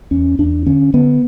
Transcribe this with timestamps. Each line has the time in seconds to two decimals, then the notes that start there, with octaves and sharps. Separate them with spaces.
0.11 E2 C#4
0.39 E2 D4
0.66 D3 C#4
0.94 D3 B3